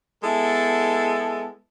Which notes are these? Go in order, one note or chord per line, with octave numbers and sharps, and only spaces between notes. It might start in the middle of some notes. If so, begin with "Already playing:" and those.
G#3 B3 E4 A4